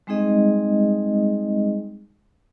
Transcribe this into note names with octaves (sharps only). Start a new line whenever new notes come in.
G3 G#3 C4 D#4 G#4 D#5